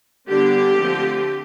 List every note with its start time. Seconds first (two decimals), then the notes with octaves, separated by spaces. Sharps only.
0.27 D3 G3 B3 D4 G4
0.78 D3 F3 A3 C4